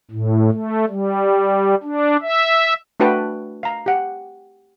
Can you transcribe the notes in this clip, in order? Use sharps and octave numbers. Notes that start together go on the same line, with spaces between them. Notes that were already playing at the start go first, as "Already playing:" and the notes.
A2
A3
G3
D4
E5
A3 D4 F#4 B4 G5 A5
F5 A#5
G4 F#5